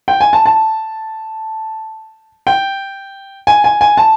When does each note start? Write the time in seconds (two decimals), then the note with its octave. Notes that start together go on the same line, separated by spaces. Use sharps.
0.08 G5
0.21 G#5
0.33 A5
0.46 A5
2.47 G5
3.47 G#5
3.64 G#5
3.81 G#5
3.97 A5